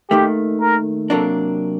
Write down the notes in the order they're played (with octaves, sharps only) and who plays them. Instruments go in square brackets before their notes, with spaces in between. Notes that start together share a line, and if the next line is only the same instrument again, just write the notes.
[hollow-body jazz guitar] D#2 D#3 A3 [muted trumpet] G4
[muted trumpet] A#4
[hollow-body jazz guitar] C3 F#3 A#3 D4 [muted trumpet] A4